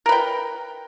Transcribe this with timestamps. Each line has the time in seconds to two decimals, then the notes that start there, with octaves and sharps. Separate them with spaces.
0.06 A#4
0.09 B4
0.12 G5